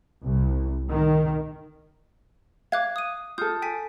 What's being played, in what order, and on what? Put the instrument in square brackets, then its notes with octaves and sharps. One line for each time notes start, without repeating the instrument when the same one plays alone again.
[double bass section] C2
D#3
[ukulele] F5 [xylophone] D6 F#6 G#6
[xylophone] D#6 D#7
[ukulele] F4 A4 [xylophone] D#6 G6
[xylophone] G5 G#5 B6